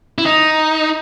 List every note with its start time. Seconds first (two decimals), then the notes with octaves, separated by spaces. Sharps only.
0.18 E4
0.26 D#4